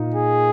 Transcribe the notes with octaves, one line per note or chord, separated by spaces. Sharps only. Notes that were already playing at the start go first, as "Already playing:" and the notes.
Already playing: A#2 A#3 D#4
G#4